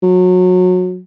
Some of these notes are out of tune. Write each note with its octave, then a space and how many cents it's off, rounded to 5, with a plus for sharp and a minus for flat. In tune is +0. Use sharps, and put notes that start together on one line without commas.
F#3 -25